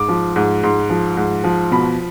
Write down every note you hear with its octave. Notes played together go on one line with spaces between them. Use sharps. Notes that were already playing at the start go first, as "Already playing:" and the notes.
Already playing: G#2 D6
F3
G#2
G#2 C6
F3
G#2
F3
B2 B5